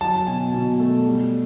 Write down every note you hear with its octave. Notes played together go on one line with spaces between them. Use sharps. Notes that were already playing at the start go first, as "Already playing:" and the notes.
F#3 A5
B2 G#5
B2
A3
G3